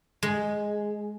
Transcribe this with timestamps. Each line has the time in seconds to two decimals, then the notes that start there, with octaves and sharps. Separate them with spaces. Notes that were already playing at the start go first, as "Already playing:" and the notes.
0.23 G#3